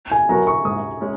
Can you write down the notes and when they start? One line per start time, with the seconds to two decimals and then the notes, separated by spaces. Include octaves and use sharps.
0.12 G#5
0.29 F#3 B3 F#4 A#4 A#5
0.47 C#6
0.65 G#2 D#6
1.00 G#3 C#4